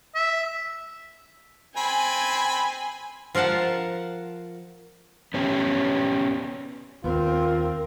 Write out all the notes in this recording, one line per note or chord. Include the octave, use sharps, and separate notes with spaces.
E5
C4 G#5 B5
F3 A#4 F5 F#5 A5
B3 C#4 G4
D#2 C4 F4 A#4